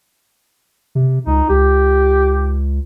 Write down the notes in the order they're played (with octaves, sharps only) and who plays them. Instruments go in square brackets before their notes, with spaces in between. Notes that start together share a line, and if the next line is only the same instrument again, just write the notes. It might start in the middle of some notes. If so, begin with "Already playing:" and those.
[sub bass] C3
[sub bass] C#2 [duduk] D#4
[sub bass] C#2 [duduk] G4